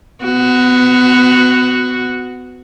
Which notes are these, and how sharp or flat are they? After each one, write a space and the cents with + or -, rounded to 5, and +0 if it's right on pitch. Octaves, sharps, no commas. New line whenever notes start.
B3 +30 F#4 +0